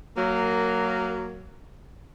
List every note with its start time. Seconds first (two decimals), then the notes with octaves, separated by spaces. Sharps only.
0.17 F#3 A#3